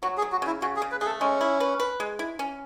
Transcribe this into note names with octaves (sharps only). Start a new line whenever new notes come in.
F#3 F#4
G#4
F#3
F#4
C#3 E4
C#3 F#4
G#4
C#3
B4
A3 G#4
A4
G#3 C#4
E4
B4
B4
G#3
E4
C#4